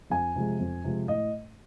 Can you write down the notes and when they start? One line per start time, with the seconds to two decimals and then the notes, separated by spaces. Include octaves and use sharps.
0.10 F2 G#5
0.36 C3 F3 G#3
0.60 F2
0.84 C3 F3 G#3
1.08 A2 D#5